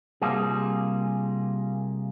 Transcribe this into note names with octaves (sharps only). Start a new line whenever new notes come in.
C3 G3 A#3 F4 G#4